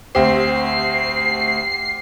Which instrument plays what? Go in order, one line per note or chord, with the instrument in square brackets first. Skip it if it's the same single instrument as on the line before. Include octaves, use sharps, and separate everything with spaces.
[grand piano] D2 C4 [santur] G4 [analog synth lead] C7